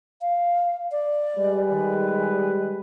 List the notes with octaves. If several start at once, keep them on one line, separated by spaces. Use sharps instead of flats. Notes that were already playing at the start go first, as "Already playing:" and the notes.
F5
D5
G3 G#3 B4
D#3